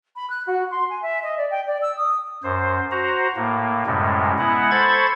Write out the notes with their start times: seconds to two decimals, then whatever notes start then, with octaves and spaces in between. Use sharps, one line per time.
0.16 B5
0.30 F#6
0.47 F#4
0.71 C6
0.90 G#5
1.02 E5
1.23 D#5
1.38 D5
1.51 G5
1.67 D5
1.82 E6
1.97 D#6
2.43 F#2 C5
2.91 F#4 C5 A#5
3.36 A2 A#3
3.86 F#2 A2 C3 G3 G#3
4.39 G#3 B3 E4 F#5
4.71 A4 C5 B5 C#6 G#6 A6